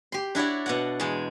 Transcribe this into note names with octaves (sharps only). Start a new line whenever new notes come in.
G4 C6
D4 E4 F#4 C#5 D5
B2 D5 F#5
E2 G#3 A5